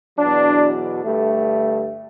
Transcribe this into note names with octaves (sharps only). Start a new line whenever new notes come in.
E2 B2 F#3 D4
G2 D3 A3